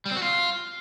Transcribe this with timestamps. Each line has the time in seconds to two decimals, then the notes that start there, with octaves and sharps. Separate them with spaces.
0.06 G3
0.11 C4
0.17 F#4
0.22 F4